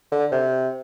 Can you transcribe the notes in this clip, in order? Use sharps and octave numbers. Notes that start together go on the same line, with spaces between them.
D3
C3